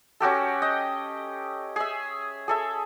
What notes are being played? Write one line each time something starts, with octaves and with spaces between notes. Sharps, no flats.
C#4 F#4 G4 A4
D#5 G5
G#4 E5
G#4 A4 E5